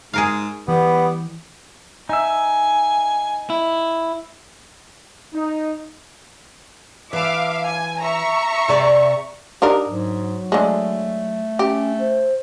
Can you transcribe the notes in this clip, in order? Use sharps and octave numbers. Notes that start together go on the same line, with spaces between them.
G#2 G#4 A#4 F5
E3 G3 B3
D#4 E5 G#5
E4
D#4
E3 E5 F5 A5 D6
G#5
E5 A#5 C#6
C3 G#4 D5
D4 D#4 G4 A#4
G#2 F#3
D3 G#3 A3
C#4 G4
C5